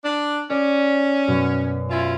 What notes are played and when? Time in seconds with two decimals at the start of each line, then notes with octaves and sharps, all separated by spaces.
0.04 D4
0.50 C#4 D5
1.28 F#2 B2
1.89 C#4 E4 F4 E7